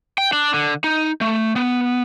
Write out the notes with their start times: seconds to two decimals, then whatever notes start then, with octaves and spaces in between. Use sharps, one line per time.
0.18 G5
0.33 D4
0.54 D3
0.84 D#4
1.21 A3
1.56 B3